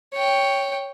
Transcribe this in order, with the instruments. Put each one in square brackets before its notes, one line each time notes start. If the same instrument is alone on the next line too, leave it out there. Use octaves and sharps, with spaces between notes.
[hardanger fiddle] C#5 G5